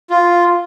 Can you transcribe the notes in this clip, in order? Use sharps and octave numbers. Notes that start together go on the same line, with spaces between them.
F4